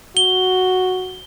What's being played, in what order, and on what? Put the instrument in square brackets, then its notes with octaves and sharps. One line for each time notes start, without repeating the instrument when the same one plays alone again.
[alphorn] F#4 [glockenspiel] G7